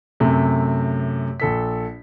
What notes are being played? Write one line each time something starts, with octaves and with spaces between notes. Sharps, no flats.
F#2 C3 A3
A#1 A4 B6